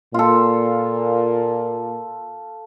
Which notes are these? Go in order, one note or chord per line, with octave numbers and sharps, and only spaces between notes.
A#2 F4 A4